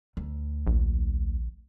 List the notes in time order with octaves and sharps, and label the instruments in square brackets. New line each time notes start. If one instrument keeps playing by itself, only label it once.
[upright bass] D2
[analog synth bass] A#1